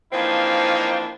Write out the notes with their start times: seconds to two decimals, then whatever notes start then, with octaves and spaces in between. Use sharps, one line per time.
0.13 E3 F3 A#3 C4 D4 D#4